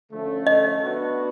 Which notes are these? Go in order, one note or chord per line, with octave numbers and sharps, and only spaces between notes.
D3 F3 A3 C#4
D#5
B3 D4 F#4 B4